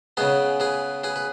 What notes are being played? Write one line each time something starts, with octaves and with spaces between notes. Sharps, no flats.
C#3 G#3 B3 G#4 B4
G#4 B4
G#4 B4
B4